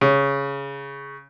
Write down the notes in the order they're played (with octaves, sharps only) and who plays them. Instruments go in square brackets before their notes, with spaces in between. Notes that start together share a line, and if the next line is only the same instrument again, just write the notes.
[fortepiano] C#3